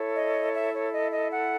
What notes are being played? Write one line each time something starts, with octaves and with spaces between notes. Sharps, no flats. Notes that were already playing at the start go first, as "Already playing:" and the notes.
Already playing: E4 A4 C#5
D#5
E5
C#5
D#5
D#5
F#5